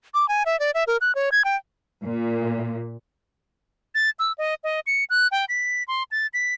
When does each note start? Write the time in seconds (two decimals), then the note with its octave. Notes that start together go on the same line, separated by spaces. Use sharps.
0.14 D6
0.29 G#5
0.46 E5
0.60 D5
0.74 E5
0.87 A#4
1.01 F#6
1.15 C#5
1.32 G#6
1.45 G5
2.05 A#2
3.95 A6
4.19 E6
4.38 D#5
4.64 D#5
4.87 C#7
5.10 F#6
5.32 G5
5.49 B6
5.88 C6
6.11 A6
6.34 B6